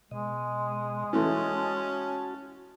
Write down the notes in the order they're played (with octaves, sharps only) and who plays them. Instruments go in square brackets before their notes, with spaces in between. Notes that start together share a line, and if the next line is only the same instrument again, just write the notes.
[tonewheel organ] B2 D#5 [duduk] G#3
[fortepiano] E3 A3 [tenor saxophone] C#4 [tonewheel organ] F#4 A5